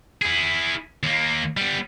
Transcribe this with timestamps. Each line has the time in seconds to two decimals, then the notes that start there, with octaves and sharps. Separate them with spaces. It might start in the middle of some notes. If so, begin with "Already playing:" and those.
0.22 E4 G#4
1.03 D#2 A#3
1.57 G3 B3